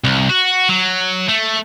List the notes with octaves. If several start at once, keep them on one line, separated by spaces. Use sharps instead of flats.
C2
F#4
F#3
A3